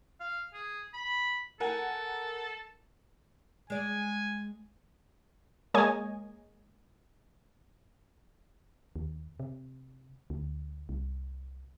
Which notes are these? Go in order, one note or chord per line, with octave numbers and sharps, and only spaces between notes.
F5
G#4
B5
A4 A#4 F#5 G#5
G#3 D5 G#5
G#3 A#3 C#5 D#5 G#5
D#2
C3
D2
C2